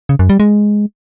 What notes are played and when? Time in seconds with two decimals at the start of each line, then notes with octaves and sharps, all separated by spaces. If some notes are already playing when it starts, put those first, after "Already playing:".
0.09 C#3
0.19 F#2
0.29 G3
0.40 G#3